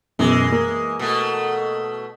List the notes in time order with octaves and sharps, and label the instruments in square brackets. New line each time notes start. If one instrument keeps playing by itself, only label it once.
[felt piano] F#2 B2 [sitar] E3 G#3
[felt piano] A#3
[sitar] B2 A3